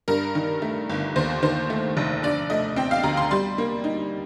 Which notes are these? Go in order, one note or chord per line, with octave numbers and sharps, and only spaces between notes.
G2 A#4
D#3
A3
G1
D#2 C5
D#3 C5
A3
F1
D3 D5
A3 D#5
C4 G5
F5
D2 A#5
C6
G3 C6
A#3
D#4